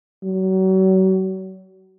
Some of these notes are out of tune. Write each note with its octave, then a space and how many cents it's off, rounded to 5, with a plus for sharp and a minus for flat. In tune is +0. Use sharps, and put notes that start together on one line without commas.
F#3 +35